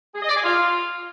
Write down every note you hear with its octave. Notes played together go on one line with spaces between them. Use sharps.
G#4
D#5
D5
G#4
F4